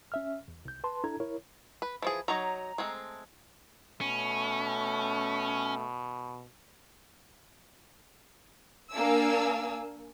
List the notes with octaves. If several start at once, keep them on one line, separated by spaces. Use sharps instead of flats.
C#4 E5 F6
E2
C2 G6
B4 A5 C6
D4 E4 A4 A#5 G#6
E4 A#4 C#5
B4
E3 F3 G#4
F#3 D#4 C#5 A#5
G#3 A3 C4
B2 A3 C#4
A#3 D4 F5 G#5 E6